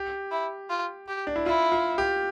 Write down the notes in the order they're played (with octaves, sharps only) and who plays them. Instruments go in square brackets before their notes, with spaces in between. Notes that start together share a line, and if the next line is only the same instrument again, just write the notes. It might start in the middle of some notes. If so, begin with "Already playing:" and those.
Already playing: [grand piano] G4
[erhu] E4
F4
G4
[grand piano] D4
E4
[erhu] E4 [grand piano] F4
[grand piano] F4
G4